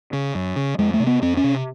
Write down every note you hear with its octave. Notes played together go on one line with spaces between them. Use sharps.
C#3
F#2
C#3
F2 G#3
A3
C3
B3
F2 C4
C#4
C3